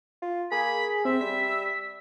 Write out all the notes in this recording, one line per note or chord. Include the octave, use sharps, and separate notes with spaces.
F4
A#3 G#4 B5
C3 C4 E5
G3 B6